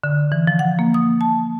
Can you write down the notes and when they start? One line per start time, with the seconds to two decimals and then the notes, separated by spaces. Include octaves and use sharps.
0.04 D3
0.32 E3
0.47 F3
0.59 F#5
0.79 A#3
0.94 D#6
1.21 A5